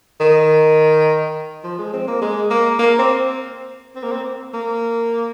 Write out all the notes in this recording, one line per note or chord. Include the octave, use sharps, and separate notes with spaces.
D#3
F3
G#3
C4
A#3
G#3
A#3
A#3
C4
C4
A#3
C4
A#3